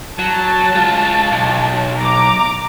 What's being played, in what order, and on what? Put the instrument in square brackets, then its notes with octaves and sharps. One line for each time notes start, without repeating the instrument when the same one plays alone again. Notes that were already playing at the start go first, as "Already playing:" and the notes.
[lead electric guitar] F#3 [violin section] A5
[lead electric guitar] G#3 F4
B1
[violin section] A#5 D6